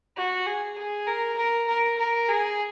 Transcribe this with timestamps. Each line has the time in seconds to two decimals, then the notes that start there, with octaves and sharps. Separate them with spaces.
0.17 F#4
0.46 G#4
0.77 G#4
1.07 A#4
1.38 A#4
1.68 A#4
1.98 A#4
2.29 G#4